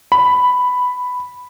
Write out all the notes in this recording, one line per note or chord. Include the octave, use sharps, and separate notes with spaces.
B5